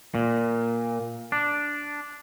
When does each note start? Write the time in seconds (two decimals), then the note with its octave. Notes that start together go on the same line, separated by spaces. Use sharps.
0.15 A#2
1.32 D4